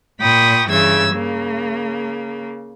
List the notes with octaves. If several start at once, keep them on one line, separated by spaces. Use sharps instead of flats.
A#2 G5 B5 C#6 D#6
G2 C#3 E3 E6 G#6
C#3 A#3